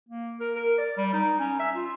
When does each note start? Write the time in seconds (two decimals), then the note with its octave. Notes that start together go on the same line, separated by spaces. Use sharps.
0.09 A#3
0.40 A#4
0.55 A#4
0.78 D5
0.97 G3
1.13 D#4
1.39 C#4
1.59 E5
1.75 F4